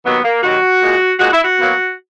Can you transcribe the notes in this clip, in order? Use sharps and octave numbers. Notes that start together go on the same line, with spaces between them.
D#2 D#3 F#3 B3
A#3
D#2 D#3 F#3 F#4
A#2 G#3
A#2 G#3 F#4
E4
F#4
B2 F#3 A#3